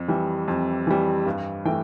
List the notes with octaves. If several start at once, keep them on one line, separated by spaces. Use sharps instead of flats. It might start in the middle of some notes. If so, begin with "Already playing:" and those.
Already playing: F2
E3 G3
F2
E3 G3
G2
E3 A3 G5